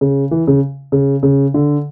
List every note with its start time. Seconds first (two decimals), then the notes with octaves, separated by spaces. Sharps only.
0.01 C#3
0.31 E3
0.47 C#3
0.92 C#3
1.23 C#3
1.54 D3